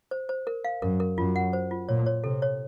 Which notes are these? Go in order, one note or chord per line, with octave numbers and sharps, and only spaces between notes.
C5
C5
A#4
F5
F#2 A#4
A#4
F#2 F4
F#5
C5
F4
A#2 C#5
C#5
C3 A4
C#5